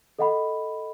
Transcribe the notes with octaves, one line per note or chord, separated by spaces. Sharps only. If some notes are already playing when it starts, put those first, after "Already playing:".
A4 D#5 F#5 B5